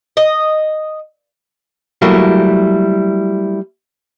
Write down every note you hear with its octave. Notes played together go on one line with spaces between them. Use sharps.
D#5
F#3 G3 A3 A#3 E4 F#4